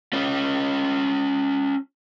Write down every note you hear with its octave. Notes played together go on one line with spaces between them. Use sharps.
C#4 F4